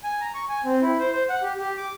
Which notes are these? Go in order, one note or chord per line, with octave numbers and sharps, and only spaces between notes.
G#5
A#5
C#6
G#5
C4
E4
C5
C5
F#5
G4
G4
D6